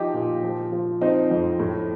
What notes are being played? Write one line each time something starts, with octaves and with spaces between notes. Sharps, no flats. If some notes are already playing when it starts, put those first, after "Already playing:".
Already playing: F3 D#4 G4
A#2
F3
F3
F3 C4 D#4
F2
A2